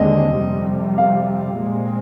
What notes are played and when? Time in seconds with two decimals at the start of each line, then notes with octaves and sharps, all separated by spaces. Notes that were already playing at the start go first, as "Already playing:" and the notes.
Already playing: D#2 D3 G#3 C4 D#5
0.36 F2 C3 G3
0.98 F5
1.60 A#2 G#3 C4